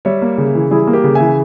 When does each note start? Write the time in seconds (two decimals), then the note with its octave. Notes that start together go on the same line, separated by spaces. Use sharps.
0.05 G3 C#5 E5
0.22 A#3
0.38 C#3
0.55 E3
0.71 G3 E4 G#4
0.87 A#3
0.93 G4 A#4
1.04 C#3
1.15 E5 G#5
1.21 E3